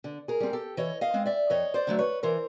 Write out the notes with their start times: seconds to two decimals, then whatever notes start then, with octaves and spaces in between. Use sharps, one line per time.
0.04 D3
0.28 G#4 A#4
0.40 G3 C4
0.53 G4 A4
0.77 E3 C#5 D#5
1.01 D#5 F5
1.14 G#3 C4
1.26 D5 E5
1.50 F2 C#5 D#5
1.74 C5 D5
1.87 D3 F#3 A3
1.98 B4 C#5
2.23 E3 A#4 C5